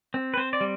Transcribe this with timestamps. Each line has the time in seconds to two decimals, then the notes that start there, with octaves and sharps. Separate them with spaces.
0.14 C4
0.34 B4
0.37 C4 C5
0.53 D5
0.61 G3